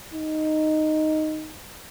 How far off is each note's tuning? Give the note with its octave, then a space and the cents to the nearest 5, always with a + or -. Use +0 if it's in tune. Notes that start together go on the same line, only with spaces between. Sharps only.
D#4 -5